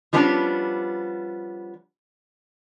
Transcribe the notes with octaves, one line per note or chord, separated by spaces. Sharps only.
F3 G3 B3 C#4 D4